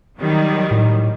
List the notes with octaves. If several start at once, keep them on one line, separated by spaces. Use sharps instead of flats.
D#3 F#3 G3
A2